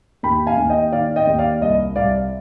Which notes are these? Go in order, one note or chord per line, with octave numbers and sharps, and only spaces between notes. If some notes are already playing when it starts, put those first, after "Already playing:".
D#2 G5 B5
F5 G#5
D#2
D#5 G5
D#3 D5 F5
D#5 G5
D#2
D5 F5
C2 D#5
C2 D5 F5